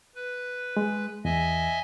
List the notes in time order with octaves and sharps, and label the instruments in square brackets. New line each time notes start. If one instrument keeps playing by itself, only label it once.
[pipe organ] B4
[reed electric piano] G#3
[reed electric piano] E2 [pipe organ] D#5 E5 G#5